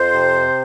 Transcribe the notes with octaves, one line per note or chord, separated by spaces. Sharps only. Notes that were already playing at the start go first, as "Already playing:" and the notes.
Already playing: F2 C5
C3